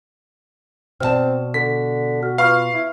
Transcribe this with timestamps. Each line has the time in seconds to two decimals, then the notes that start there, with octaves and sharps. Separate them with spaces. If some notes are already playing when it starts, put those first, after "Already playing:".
1.00 B2 C4 D5 E5 A5 F6
1.54 D3 B6
2.23 F#4 F6
2.38 F4 B4 F5 B5 C#6 F6
2.74 E4